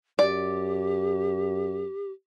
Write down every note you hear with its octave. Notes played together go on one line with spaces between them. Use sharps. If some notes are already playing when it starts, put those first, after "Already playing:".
F#2 G4 D5